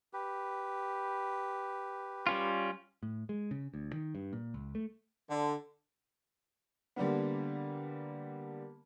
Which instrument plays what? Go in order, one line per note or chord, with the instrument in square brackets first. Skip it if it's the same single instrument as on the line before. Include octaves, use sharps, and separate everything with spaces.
[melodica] G4 B4
[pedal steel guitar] G3 C#4 F4
[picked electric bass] A2
G#3
C#3
D2
D#3
G2
A#2
C#2
A3
[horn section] D3
[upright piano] D3 G3 A#3 B3